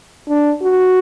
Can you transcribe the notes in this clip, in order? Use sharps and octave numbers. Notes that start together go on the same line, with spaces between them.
D4
F#4